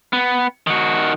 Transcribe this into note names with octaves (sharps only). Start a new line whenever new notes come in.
B3
D#3 F#4